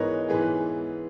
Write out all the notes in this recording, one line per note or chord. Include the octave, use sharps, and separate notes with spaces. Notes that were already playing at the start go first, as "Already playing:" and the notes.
Already playing: G#2 E3 G#3 B3 A#4 B4 C#5 D#5
G#2 E3 B3 G#4 B4